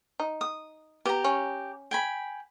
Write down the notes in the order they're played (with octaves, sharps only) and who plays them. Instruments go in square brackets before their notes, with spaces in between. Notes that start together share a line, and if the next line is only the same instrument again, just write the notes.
[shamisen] D#4
[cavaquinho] D#6
[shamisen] B3 [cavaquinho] G4 A#5
[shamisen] C#4
[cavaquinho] G5 G#5 B5